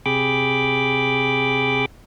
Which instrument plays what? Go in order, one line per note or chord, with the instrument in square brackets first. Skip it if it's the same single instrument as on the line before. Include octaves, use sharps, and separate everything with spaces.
[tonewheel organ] C3 G#4 G5 B5 D6